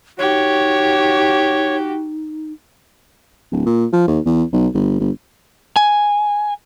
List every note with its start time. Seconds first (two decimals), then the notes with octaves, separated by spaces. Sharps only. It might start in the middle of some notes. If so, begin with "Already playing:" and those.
0.18 D#4 F#4 G4 C#5
3.52 D1
3.66 A#2
3.93 F3
4.08 D#2
4.26 E2
4.53 B1
4.74 G1
5.00 G1
5.76 G#5